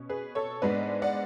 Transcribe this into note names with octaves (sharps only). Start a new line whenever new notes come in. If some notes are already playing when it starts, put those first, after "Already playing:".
Already playing: B2 C#4
G#4 B4
A4 C#5
G#2 G#3 B3 D4 B4 D5
D5 F#5